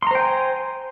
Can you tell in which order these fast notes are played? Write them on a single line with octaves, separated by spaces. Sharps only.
C6 A#5 C5 G5 G#5